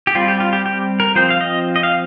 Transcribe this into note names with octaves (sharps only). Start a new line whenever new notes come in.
G4
G3 C4 F4
G4
F4
G4
G4
A#4
F3 C4 C5
F5
D#5
D#5
F5